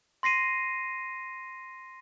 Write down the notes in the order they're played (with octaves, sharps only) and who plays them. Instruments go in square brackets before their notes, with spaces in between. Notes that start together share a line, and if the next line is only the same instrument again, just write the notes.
[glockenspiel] C6 A#6 C7 D#7